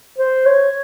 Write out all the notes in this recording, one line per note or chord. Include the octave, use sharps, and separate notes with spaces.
C5
C#5